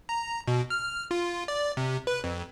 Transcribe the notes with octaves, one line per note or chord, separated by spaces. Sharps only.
A#5
B2
F6
F4
D5
C3
B4
F2